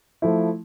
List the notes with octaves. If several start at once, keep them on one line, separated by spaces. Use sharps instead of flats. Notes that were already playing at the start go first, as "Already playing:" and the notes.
F3 A3 E4